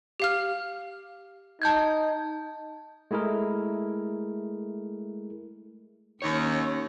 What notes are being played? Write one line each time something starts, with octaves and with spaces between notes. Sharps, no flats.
G4 F5 F6
D#4 A5 G6 G#6
G#3 A3 E4 G#4 A#4
D#2 D#3 A#3 C#4 C#5